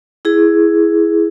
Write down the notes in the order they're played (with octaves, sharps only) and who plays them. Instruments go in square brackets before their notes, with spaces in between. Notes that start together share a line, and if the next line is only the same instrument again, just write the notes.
[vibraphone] E4 G#4